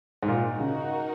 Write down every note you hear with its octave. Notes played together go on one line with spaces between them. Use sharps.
G#2
A#2 D#4 F#4 A#4
C#3